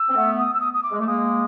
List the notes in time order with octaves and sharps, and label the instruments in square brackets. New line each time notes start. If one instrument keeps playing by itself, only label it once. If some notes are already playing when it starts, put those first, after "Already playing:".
Already playing: [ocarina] E6
[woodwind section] C4
A3 B3
[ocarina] D#6
E6
D#6
D#6
D6
[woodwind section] G#3
[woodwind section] A3 [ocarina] D6
[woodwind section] G#3 A#3 [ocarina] D#6